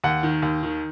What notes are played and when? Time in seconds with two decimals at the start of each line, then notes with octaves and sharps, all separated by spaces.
0.04 D#2 F#5
0.23 D#3
0.42 D#2
0.63 D#3